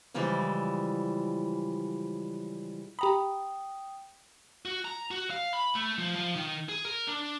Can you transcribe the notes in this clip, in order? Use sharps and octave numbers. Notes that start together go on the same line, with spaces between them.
C#3 E3 F3 G3 G#3 E4
G4 G5 A#5 B5 D#6
F#4
A#5
F#4
F5
B5
A3
F3
F3
D#3
G#4
A#4
D4